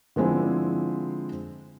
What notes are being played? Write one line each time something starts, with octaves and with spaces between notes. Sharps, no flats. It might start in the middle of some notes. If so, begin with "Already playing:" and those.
D3 F3 G#3 C4 E4